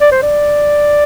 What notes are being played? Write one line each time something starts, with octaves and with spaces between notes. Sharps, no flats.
D5
C5
D5